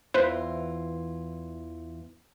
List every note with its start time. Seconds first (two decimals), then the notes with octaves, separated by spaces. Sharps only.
0.14 E2 E3 F4 B4 C5